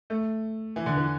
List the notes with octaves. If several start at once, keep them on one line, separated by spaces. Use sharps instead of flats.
A3
E3
D3
E3